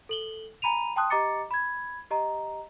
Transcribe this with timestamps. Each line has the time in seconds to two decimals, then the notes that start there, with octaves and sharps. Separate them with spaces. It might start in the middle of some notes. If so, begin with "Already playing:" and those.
0.09 A4 F#7 G7
0.62 G#5 A#5 B5 D#7 F7
0.96 G5 A5 C6 D#6 F#6
1.10 G4 D#5 A#5 D6 A6 C#7
1.51 B5 G#6
2.11 G4 D#5 A#5